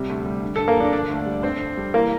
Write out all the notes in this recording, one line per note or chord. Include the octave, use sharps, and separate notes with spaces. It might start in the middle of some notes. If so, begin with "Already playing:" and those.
Already playing: C3 G3
D2
G3
D3
G2 A4
A#3 A#4
F3 D4 D5
D3 D4 D5
D2
G3
D3 C4 C5
F2
G3
E3 A#3 A#4